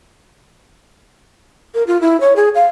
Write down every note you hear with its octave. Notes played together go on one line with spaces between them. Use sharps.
A#4
F4
E4
C#5
G#4
F5